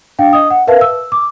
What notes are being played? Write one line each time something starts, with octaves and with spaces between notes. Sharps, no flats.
D4 F5 G5
D#5 D#6
F#5
A#4 B4 E5 F5 A5
E6
D6